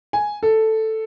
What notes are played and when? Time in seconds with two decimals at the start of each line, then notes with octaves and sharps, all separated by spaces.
0.13 G#5
0.43 A4